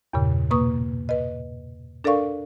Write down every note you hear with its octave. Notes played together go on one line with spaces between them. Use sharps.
E2 G2 A#2 C#3
B2 A#3 B4 C#6 D#6
B4 D#5
D4 A4 A#4 D5 F5 C#6